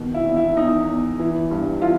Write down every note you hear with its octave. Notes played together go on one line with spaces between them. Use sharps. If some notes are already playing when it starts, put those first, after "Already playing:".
Already playing: B2 D#3
E4
E2
E4
E2 D#4
E2
E3
G2
E3 F4